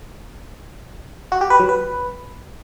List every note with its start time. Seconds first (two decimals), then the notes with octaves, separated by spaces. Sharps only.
1.32 F#4
1.41 G4
1.50 B4
1.60 F#3
1.69 B4